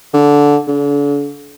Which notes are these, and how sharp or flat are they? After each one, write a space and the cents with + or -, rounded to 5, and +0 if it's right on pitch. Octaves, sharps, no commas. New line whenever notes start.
D3 -15
D3 -40